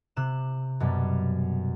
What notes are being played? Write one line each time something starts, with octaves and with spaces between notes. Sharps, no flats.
C3 F#6 E7
F#2 B2 G3